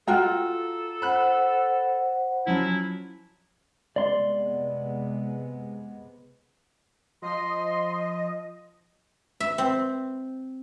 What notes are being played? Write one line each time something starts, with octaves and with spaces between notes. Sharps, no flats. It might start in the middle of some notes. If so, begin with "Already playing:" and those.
F4 F#4 A4 G5 A#5
C5 F#5 B5 F#6
F3 F#3 C#4 E4
C3 G#3 B3 D5 C6
F3 D#5 C6
E5
C4